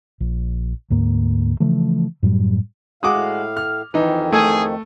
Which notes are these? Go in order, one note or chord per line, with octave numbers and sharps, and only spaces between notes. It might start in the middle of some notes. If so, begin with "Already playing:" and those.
A#1
D2 G#2 A#3
C#3 E3 F3 A3
F#2 A2 F#3 G3
A2 G#3 F#4 F5 D6 D#6
F6
F2 D#3 E3 D#4
A3 G#4